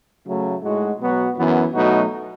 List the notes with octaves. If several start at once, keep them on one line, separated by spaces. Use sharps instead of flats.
C#3 F#3 A3
A2 G#3 D#4 F#4
B2 F#3 B3 F#4
F#2 E3 B3
B2 F#3 A3 D#4 F#4